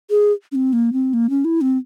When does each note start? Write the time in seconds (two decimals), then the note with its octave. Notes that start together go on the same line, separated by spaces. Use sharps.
0.10 G#4
0.52 C#4
0.55 C4
0.73 A#3
0.93 C4
1.14 A#3
1.30 C#4
1.45 E4
1.61 C4